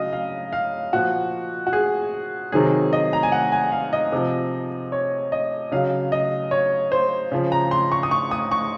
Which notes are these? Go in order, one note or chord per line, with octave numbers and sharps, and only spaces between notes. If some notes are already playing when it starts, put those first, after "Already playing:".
Already playing: C#3 F#3 D#5 F5
F5
F5
A#2 F3 F#4
F#4
G#4
C3 D#3 F#3 G#4
D#5
A#5
G#5
F#5
G#5
F5
D#5
C3 F3
C#5
D#5
C#3 F#3 F5
D#5
C#5
C5
C#3 F3
A#5
C6
C#6
D#6
C#6
D#6
C#6